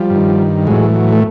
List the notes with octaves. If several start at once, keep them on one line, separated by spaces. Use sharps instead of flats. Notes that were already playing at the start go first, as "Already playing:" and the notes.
Already playing: F3 G3
G2
D#3
A2 E3 F#3 G#3
F#3
A3